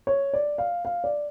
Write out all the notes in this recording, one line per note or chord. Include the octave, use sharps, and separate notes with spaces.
C#5
D5
F5
F5
D5